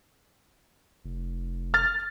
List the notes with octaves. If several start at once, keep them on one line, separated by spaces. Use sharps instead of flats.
F1
F6 A6